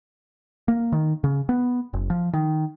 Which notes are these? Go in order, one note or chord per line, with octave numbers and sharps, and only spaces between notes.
A#3
D#3
C#3
B3
F#1
F3
D#3